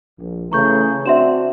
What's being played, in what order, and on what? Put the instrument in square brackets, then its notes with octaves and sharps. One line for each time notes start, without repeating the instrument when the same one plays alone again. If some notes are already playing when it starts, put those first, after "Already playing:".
[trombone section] A#1
[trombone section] C#3 E3 A3 [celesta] A#5 C#6 G6
[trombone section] C4 D4 F#4 [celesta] E5 C6 E7